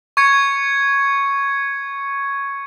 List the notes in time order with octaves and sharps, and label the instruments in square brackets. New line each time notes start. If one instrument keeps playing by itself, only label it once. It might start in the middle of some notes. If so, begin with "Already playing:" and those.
[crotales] C#6 G#6 C#7